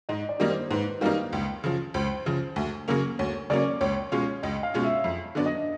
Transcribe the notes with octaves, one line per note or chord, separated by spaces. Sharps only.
G#2 D#5
D5
D#3 G3 A#3 D#4
C5
G#2 B4
D#3 G3 A#3 D#4 F5
C#2
C#3 F3
C#2 C5
C#3 F3
D2
C#3 F#3 A#3 C#4
D2 C#5
C#3 F#3 A#3 C#4 D5
C#2 C#5
B2 G#3 C#4 F4
C#2 D#5
F5
B2 G#3 C#4 F4
E5
F2
D3 F#3 B3 D4
D#5